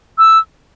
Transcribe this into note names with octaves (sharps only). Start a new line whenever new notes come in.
E6